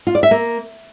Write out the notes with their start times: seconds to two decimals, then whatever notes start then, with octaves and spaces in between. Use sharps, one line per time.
0.07 F4
0.15 D5
0.23 E5
0.31 A#3